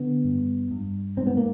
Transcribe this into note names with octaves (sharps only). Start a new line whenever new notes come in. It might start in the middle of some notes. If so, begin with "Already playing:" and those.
Already playing: D3 B3
G2
G2
G#2 C4
B3
A#3